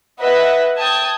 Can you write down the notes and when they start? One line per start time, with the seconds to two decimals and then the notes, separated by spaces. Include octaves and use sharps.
0.20 B4 D#5 E5 F#5
0.78 G5 A5 D#6 G#6